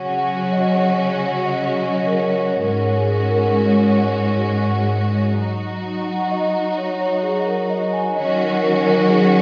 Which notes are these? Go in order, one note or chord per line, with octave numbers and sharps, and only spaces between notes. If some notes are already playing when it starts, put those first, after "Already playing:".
Already playing: C#3 F#3 C#4 F#4 F#5
F#5
D#5
F#5
F#5
F#5
D#5
D#5
D#5
A#4
C#5
C#5
G#2 G#3 C#4 F#4 A#4
G#4
A#4
F#3 D#4 F#4
F#5
D#5
C#5
C#5
G#4
A#4
D#5
G#5
D#3 F#3 C#4 F#4 D#5
A#4
A#4
A#4
G#4